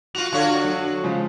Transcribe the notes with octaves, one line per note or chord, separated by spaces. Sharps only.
F4 F#4 F7
D3 F4 F#4 C#5
F#3
C#3 F3 G#3